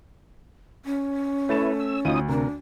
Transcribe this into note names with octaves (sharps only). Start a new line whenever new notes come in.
C#4
A3 E4 B4 C#5 A6 E7
E6
D2 D#4 F4 D#6
C3 D4 A#4